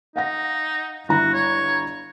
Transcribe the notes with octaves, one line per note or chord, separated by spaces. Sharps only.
D#4 F5 F#5 A#6
G1 E4 F#4 A#5
C#5